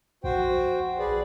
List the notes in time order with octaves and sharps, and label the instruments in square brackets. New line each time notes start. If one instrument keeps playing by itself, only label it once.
[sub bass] A#1 [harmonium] F#4 C5 G5
[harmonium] G#4 B4 D5